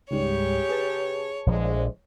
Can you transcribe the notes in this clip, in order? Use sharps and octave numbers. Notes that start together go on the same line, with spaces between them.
C#2 G#2 C#3 G3 G4 C#5
G#4 B4 A5
A#1 A2 D3 F3 G#3